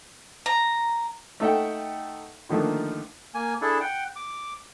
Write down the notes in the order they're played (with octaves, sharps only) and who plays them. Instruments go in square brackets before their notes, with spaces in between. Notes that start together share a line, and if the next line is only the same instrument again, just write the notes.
[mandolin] A#5
[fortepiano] A3 D#4 A4 E5 F#5 G5
D3 D#3 F3 A3 A#3 D4
[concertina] A#3 G#5
D4 E4 G#4 A4
F#5 G5
D6